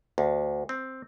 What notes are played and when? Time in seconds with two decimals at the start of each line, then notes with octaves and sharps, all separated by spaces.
0.18 D2
0.69 C4